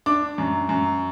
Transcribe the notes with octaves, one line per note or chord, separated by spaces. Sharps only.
D4 D6
F#2
F#2